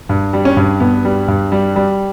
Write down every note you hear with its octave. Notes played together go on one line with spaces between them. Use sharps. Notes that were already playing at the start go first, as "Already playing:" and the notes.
G2
G3
C#4
G2
G2 B3
G3
G2
G3
G3